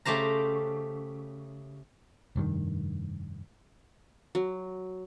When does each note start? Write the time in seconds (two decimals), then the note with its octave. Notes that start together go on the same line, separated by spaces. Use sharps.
0.05 C#3 A3 G4 C5 A#5
2.36 F1 G2 A#2 D#3
4.35 F#3